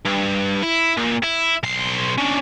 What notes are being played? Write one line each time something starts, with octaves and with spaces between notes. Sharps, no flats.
G2
E4
A#2
E4
B1 C6
C#4 D4